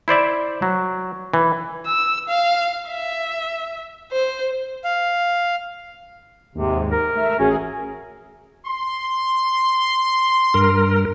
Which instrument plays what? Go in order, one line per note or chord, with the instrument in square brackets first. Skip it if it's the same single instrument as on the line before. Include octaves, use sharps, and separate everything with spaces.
[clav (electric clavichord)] E4 C5 D5 E5
F#3
E3
[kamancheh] E6
F5
E5
C5
[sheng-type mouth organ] F5
[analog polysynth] D#2 G#2 [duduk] C3
[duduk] A#4
[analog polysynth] A3 E5 F6
[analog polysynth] A1 F#4 G#4 [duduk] C#4
[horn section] C6
[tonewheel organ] G2 A#4